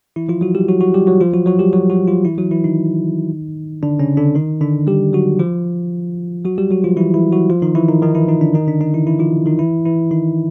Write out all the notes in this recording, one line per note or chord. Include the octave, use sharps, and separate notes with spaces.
E3 E4
F3 F4
F#3 F#4
G3 G4
F#3 F#4
F#3 F#4
G3 G4
F#3 F#4
F3 F4
F#3 F#4
F#3 F#4
G3 G4
F#3 F#4
F#3 F#4
F3 F4
E3 E4
F#3 F#4
E3 E4
D#3 D#4
D3 D4
C#3 C#4
D3 D4
D#3 D#4
D3 D4
G3 G4
F#3 F#4
F3 F4
F#3 F#4
G3 G4
F#3 F#4
F3 F4
E3 E4
E3 E4
F#3 F#4
F3 F4
D#3 D#4
E3 E4
D#3 D#4
D#3 D#4
E3 E4
D#3 D#4
D3 D4
D#3 D#4
D3 D4
D#3 D#4
E3 E4
E3 E4
F3 F4
D#3 D#4
E3 E4
E3 E4
D#3 D#4